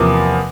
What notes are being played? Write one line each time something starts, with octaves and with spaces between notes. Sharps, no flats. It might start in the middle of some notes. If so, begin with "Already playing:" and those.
Already playing: E2 C3 F3 A#3 D6